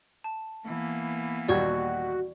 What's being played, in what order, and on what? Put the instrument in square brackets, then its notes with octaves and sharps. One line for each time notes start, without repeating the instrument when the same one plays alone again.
[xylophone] A5
[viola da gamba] E3 A#3 B3
[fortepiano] D#2 A#2 G3 [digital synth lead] F#4 [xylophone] D5 C#6 G#6